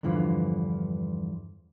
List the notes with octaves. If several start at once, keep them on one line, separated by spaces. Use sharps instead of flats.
E2 G2 D3 E3 F3